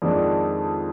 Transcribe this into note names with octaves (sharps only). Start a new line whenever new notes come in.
F2 D#3 G#3 D4 D5